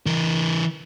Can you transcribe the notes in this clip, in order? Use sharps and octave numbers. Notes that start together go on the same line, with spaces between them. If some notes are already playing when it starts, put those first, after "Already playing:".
E3 A#4